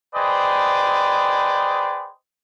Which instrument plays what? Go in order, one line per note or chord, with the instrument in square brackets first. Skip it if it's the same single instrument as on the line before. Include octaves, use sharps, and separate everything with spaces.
[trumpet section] G#4 B4 C5 D5 D#5 G5